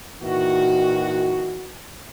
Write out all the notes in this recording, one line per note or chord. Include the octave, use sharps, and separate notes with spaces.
A#2 D#3 E3 F#4